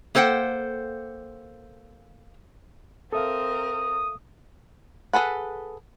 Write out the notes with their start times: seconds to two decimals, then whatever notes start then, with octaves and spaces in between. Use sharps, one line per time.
0.15 A#3 A4 C5 F#5 G5
3.12 C4 A4 A#4 E5 F5 D#6
5.13 G#4 A4 B4 F#5